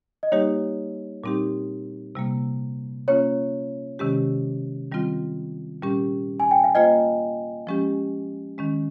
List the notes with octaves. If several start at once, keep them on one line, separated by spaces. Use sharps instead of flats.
D#5
G3 A#3 D#4 G4 C#5
A#2 G3 C4 D#4 G4
C3 G3 A#3
A#3 C#4 F4 C#5
C3 D#3 G#3 C#4 G4
D#3 G3 C4 F4
A#2 G3 C#4 G4
G#5
G5
F5
A#3 F4 C5 D#5
F3 G#3 C#4 G4
D#3 G#3 C#4